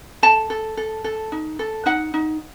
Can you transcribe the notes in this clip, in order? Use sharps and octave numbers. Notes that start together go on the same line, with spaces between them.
A4 A5
A4
A4
A4
D#4
A4
D#4 F#5
D#4